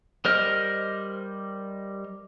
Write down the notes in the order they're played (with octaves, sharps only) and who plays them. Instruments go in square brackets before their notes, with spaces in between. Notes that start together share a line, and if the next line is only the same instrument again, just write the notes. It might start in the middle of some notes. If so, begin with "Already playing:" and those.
[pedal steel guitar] G3 A#4 C5 D#5 F6